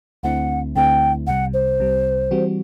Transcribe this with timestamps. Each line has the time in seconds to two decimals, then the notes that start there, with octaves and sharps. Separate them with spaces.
0.23 D2 D3 A3 C4 E4 F#5
0.76 D2 D3 A3 C4 E4 G5
1.27 C2 C3 G3 F#5
1.54 C5
1.80 C2 C3 G3
2.31 E3 G3 C4 F#4